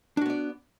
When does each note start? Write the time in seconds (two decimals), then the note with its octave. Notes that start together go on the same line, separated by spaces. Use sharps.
0.17 D4
0.21 F#4
0.26 B3
0.30 D5